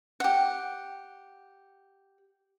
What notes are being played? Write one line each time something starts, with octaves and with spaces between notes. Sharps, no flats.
G4 F#5